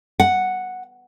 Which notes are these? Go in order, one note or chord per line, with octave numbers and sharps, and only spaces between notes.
F#5